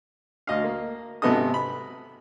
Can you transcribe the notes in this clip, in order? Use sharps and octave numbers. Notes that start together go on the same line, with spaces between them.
D2 D#5 F5
A#3
G#1 C3 B3 A4 D#5 D#6
B5